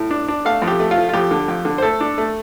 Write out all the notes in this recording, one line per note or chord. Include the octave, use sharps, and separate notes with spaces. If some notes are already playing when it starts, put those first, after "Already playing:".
Already playing: A2
D4
D4
A3 F5
F2
G4
A3
F4
F3
F4
F2 G4
D3
F2
D3
C5
A3 A4
D4
A3